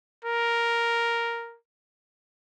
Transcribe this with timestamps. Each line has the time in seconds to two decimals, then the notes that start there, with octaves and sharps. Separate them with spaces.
0.25 A#4